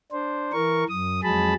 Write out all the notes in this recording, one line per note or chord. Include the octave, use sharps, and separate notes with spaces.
D4 C5
E3 A#4 C#6
F#2 D#6
F2 F#3 G#3 G#4 A5 B5